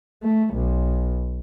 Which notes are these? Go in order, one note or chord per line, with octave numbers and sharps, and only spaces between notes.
A3
B1